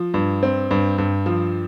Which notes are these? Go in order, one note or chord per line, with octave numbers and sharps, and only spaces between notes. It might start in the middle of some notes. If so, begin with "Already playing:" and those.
Already playing: F3
G2
C4
G2
G2
F3